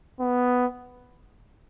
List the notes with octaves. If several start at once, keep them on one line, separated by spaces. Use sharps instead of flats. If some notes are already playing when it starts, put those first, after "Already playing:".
B3